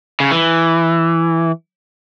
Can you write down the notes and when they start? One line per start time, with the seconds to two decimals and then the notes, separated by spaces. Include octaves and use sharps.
0.20 C#3
0.31 E3